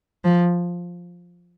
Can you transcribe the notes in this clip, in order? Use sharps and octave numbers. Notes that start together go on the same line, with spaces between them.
F3